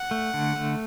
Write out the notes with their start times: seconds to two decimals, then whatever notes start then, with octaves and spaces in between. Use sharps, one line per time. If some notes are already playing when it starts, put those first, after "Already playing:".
Already playing: F#5
0.11 A3
0.34 D3
0.56 A3